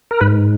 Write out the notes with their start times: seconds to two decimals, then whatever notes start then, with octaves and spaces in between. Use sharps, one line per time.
0.11 A#4
0.21 G#2 B4